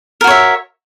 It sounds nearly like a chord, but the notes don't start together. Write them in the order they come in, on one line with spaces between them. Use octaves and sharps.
A#4 F#4 C#5 E5